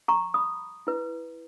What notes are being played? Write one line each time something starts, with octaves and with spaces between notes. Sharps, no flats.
A#5 C#6
B5 D#6
E4 B4